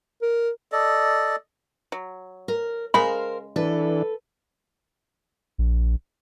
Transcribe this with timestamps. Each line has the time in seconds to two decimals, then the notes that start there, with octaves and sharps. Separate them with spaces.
0.22 A#4
0.72 A4 D5 D#5
1.92 F#3
2.48 A#4
2.94 C#3 G#3 A#4 C5 F5 B5
3.56 E3 D4 A4 B4
5.58 A#1